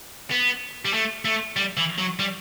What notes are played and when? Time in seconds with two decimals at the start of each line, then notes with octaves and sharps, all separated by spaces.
0.31 B3
0.85 G3
0.94 A3
1.25 A3
1.56 G3
1.77 E3
1.98 F#3
2.19 G3